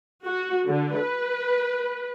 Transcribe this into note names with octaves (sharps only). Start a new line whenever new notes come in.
F#4
D3
B4